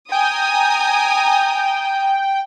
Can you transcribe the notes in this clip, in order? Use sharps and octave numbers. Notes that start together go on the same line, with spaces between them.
G5 G#5 A#5 D#6